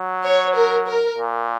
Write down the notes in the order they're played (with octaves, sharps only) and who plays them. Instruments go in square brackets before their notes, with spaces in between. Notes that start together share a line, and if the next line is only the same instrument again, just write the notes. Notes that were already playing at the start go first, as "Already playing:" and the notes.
Already playing: [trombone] F#3
[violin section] C#5
A#4
A#4
[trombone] A#2